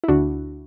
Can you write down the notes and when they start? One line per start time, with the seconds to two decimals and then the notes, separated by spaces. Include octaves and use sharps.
0.04 E4
0.08 D2 D3 D4 F#4